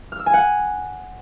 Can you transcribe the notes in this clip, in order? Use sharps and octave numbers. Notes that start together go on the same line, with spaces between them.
F6
E6
G#5
F#5